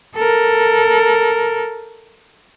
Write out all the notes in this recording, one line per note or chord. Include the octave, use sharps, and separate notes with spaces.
A4 A#4